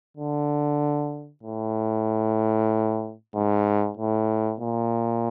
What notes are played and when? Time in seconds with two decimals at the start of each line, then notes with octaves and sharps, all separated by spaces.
0.17 D3
1.43 A2
3.34 G#2
3.97 A2
4.60 A#2